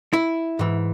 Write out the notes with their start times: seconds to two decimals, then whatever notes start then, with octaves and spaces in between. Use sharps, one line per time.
0.13 E4
0.59 G#2 E3